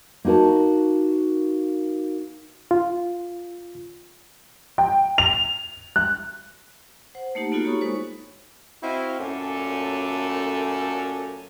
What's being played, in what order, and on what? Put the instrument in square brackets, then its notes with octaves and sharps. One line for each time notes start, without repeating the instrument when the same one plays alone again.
[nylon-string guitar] A#3 D#4 F#4 A#4 A5
[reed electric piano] F4
[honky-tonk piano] G5
F7
F#6
[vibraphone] C5 F#5
A3 A#3 D#4 G4
A#3 B3 D#4 F4 F#4 A4
A#3 G4 C#5 B5 C#6 D#6
G#3 D#4 F#4 A4 C5
[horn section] C4 E4 F#4 D#5 F5
F#2 A#2 A3 C#4 A4 D5